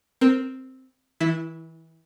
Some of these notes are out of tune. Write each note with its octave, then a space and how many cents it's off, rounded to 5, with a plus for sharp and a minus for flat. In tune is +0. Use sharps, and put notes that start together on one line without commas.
C4 +0 A#4 +0
E3 -30 E4 +0